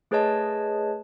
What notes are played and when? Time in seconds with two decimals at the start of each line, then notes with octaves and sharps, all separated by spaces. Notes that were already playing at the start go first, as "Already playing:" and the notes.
0.11 A3 G#4 B4 C#5 D#5 A5